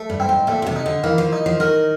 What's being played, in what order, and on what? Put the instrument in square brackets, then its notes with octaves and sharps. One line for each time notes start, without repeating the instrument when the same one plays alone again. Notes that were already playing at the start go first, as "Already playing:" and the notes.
Already playing: [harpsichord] A3
[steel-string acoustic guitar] G2
[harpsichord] C4
[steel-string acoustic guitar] G#2
[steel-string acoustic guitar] A#2 [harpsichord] A3
[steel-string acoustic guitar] B2
C3
[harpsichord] D#4
[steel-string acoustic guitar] D3
[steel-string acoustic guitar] E3 [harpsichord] A#3
[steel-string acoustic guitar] F3
[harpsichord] D#4
[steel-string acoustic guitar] F3
[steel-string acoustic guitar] D#3 [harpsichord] A#4